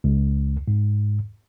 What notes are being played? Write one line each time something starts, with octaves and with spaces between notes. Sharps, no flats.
C#2
G#2